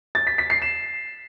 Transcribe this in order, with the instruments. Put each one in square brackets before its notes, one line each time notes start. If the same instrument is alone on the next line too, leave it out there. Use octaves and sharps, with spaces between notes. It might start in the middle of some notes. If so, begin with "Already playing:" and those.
[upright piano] A6
B6
B6
C7
E7